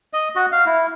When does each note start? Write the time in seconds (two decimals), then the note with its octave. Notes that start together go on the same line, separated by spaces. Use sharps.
0.13 D#5
0.36 F#4
0.52 F5
0.66 E4